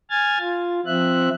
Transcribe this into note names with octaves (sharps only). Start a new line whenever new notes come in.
G#5 F6 G#6 A6
F4
F3 C4 E5 F#6